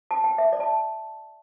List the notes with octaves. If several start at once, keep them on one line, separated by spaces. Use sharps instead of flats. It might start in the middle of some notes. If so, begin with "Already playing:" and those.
A5
G5
E5
D5
A5